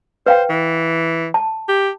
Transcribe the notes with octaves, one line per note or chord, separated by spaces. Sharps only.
B4 C5 F5 G5
E3
A5
G4